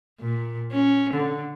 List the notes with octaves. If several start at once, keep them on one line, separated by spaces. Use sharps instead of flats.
A#2
C#4
D3